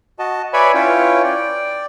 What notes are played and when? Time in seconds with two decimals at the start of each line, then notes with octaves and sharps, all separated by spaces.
0.19 F#4 D#5 A5
0.53 B4 C#5 D5 E5 G#5 B5
0.74 C#4 E4 F4 B4 C#5 G5
1.24 D5 G5